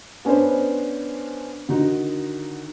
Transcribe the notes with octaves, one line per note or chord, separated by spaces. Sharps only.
B3 C#4 D4 B4 C5
D3 D#3 D#4 F#4